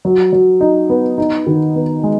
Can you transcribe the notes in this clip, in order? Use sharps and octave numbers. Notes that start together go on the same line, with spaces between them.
F#3
F#3
D#4
B3
D#4
D#3
B3
G#3